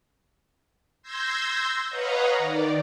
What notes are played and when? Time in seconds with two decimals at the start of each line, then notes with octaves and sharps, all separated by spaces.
1.02 C6 E6 G6 G#6 A#6
1.90 B4 C#5 D#5 F5 F#5 A#5
2.38 D#3 D5